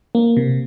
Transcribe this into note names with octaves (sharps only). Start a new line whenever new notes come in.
A#3
C3